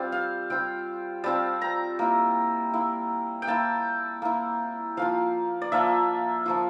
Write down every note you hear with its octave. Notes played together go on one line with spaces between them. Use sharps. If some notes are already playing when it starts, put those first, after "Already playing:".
Already playing: G3 C4 F4 G4
F5
G3 C4 F4 G5
G3 C4 F4 A5
A#5
A#3 E4
A#3 E4
G5
A#3 E4 A5
A#3 E4
F3 A#3 F4 F5
D5
F3 A#3 F4 E5
F3 A#3 F4